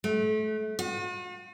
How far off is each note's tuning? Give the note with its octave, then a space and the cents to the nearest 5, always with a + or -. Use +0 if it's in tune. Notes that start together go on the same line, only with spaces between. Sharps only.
A3 -30
F#4 -45